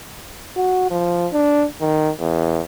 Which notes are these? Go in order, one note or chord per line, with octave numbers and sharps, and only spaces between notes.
F#4
F3
D4
D#3
E2